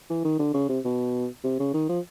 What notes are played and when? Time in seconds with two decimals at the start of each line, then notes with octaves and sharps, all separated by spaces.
0.09 E3
0.24 D#3
0.39 D3
0.54 C#3
0.69 C3
0.85 B2
1.44 C3
1.59 C#3
1.74 D#3
1.89 F3